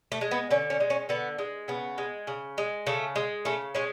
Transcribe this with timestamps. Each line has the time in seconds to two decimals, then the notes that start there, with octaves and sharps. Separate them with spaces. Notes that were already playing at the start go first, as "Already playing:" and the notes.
0.12 A3
0.21 G#3
0.31 B3
0.51 D3 C#4
0.70 C#4
0.80 G#3
0.90 C#4
1.09 D3 B3
1.39 G#3
1.68 C#3 B3
1.98 G#3
2.27 C#3
2.58 G#3
2.87 C#3 A3
3.16 G#3
3.45 C#3 A3
3.75 G#3 C#4